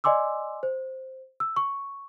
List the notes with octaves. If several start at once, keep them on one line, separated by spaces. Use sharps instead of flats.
D5 D#5 G#5 C6 D6 E6
C5
E6
C#6